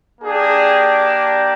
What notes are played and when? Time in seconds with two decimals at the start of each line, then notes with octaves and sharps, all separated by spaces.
0.21 A#3 D4 G4 G#4